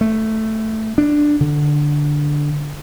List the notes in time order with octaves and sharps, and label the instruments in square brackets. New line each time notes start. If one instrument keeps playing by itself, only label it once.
[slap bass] A3
D4
D3